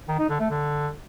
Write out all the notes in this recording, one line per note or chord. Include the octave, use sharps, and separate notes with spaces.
D#3
D#4
D3
A3
D3